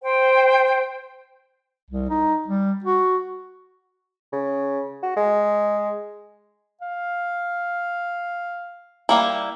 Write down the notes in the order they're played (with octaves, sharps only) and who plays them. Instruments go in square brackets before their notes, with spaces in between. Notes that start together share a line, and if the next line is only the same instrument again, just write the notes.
[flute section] C5 G5
[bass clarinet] C2
D#4
G3
F#4
[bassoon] C#3
F#4
G#3
[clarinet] F5
[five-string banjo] G3 A#3 E4